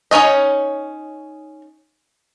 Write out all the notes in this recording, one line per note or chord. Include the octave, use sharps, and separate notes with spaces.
C#4 D#4 C#5 D#5